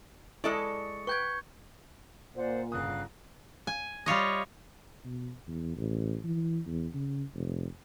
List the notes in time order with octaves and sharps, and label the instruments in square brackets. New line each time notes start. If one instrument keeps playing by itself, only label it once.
[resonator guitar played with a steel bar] G#3 A4 D5 [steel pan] E4 D#5 [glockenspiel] C#6 C#7
[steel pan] B4 G5 [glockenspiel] C#6 G6 G#6
[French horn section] A#2 [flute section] C5 D5 F#5
[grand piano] G1 C#3 D#6 [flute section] F5 F#6
[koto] G#5
G3 F4 C#5 D#5
[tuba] B2
E2
A1
E3
E2
C#3
F1